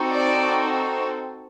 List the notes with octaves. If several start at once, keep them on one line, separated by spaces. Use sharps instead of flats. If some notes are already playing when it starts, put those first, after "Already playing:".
Already playing: C4 D#4 F#4 A4
D5